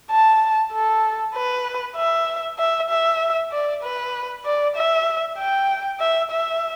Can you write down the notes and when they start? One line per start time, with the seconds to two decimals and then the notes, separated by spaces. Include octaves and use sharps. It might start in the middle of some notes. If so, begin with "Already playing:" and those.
0.11 A5
0.73 A4
1.35 B4
1.97 E5
2.59 E5
2.90 E5
3.52 D5
3.83 B4
4.45 D5
4.76 E5
5.38 G5
6.00 E5
6.31 E5